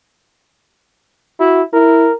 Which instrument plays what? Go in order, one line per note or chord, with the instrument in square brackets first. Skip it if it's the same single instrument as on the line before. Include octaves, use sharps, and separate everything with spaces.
[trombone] E4 [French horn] F#4
[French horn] E4 [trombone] A#4